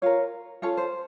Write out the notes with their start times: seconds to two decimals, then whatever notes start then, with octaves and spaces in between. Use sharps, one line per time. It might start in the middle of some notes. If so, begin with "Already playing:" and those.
0.02 F4 A#4 C#5 F5
0.62 C#4 F4 A4 C#5
0.77 C5